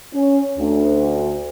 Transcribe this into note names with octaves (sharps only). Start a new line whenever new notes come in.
C#4
D2